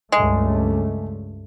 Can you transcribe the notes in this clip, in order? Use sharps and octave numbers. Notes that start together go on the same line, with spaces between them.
C#2 G2 G#3 A3